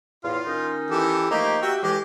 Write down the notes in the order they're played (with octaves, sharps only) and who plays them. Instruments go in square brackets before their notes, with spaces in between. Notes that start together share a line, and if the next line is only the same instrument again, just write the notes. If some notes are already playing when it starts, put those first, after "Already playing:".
[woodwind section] E2 A2 F5 [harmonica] F4
[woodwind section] D#3 C#4 D#4
[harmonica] E3 G4 A4
[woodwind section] F3 A3 G4 [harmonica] A#3 D#4
[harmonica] F#4 G5 [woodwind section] G4 E5
[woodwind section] A2 E3 G#3 [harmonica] G4